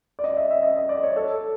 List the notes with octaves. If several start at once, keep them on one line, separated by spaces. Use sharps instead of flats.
D5
D#5
E5
E5
D#5
D#5
D5
C#5
A4